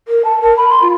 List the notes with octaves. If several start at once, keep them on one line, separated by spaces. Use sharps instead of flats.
A#4
A5
A#4
B5
C6
F4